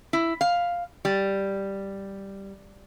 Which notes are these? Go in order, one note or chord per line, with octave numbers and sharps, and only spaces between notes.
E4
F5
G3